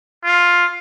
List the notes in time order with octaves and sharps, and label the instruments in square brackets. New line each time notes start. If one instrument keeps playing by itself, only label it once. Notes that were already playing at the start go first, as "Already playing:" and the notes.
[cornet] F4